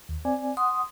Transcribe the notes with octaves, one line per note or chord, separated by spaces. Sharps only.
D#2
C4 D5 G#5
F#5 C6 D#6